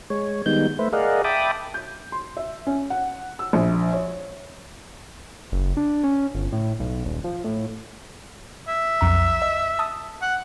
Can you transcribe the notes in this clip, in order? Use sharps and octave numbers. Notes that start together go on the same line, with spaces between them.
G#3 C#5
D#3 G3 G#3 B3 D#4 G6
A3 B4 C5 E5
G#4 A#4 D5 D#5 F5 F#5
E5 G5 A5 B5 D6 D#6
G6
C6
E5
C#4
F#5
E6
A#1
C#5
F#1
D4
C#4
G1
A2
B1
D#1
F3
A2
E5
B1 F2 A#5
D#5
A5 D#6 E6
F#5